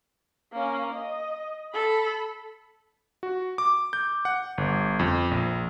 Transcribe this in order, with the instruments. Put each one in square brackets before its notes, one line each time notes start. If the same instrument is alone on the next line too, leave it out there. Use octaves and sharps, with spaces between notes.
[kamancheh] A#3 C#4
D#5
A4 B5
[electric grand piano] F#4
D6
G6
F#5
G1
F2
A#1